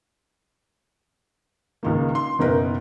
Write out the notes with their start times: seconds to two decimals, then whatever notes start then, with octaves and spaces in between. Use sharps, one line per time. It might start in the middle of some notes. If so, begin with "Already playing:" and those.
1.83 C#2 D#3 A#3
2.15 C6
2.39 F#1 B2 D#4 A#4 B4